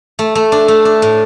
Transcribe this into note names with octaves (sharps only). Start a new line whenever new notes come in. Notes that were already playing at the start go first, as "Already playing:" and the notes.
A3
A3
D4
A3
D4
A2